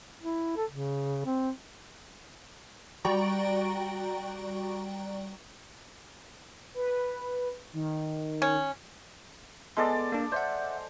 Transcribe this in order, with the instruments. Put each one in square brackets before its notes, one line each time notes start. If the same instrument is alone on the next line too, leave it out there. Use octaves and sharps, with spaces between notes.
[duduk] E4
A4
C#3
C4
[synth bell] G3 F#4 D5 G5 A#5 C#6
[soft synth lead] B4
D#3
[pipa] C#4
[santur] G#3 A4 D5 [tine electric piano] B3 C6
[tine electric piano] A#3 D4
[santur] C5 [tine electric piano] D5 E5 F#5